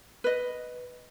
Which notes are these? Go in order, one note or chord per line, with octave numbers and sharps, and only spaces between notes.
B4 D#5